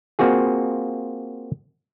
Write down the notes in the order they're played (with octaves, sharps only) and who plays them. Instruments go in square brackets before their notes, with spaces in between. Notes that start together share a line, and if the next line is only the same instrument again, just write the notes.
[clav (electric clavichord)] A#3 C4 F4 F#4 G#4